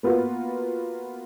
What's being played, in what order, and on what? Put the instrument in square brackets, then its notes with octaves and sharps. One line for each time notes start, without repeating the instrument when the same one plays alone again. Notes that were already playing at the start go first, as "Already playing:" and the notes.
[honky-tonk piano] A#3 B3 F4 F#4 B4